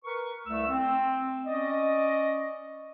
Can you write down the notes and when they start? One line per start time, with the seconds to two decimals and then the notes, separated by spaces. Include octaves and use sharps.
0.04 A#4 B4 C#6
0.46 C2 A3 E6
0.69 C4
1.46 C#4 D5 D#5